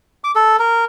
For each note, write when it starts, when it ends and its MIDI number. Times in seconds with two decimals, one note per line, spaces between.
0.24 0.31 86
0.35 0.56 69
0.59 0.85 70